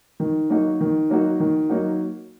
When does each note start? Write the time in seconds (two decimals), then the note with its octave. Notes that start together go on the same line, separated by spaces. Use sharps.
0.20 D#3
0.50 F#3 A#3 D#4 F#4
0.80 D#3
1.10 F#3 A#3 D#4 F#4
1.40 D#3
1.70 F#3 A#3 D#4 F#4